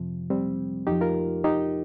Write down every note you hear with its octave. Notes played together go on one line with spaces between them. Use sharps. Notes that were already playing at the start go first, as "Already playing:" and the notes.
Already playing: F2 C3 F3
G3 C4
F2 F3 D#4 G4
F4 A#4
D#4 G4